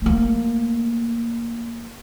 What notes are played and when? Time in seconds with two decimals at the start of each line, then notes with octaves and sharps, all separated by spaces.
0.02 A3 A#3